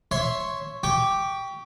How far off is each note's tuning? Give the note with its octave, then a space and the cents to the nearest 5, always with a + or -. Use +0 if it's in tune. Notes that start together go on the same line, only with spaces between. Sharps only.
C#5 +0 E5 +0 C6 +0
G4 +0 G5 +0 C#6 +30